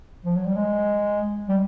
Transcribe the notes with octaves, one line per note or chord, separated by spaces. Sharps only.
F3
F#3
G3
G#3
G3